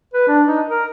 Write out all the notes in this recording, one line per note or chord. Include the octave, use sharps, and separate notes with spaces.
B4
D4
D#4
A#4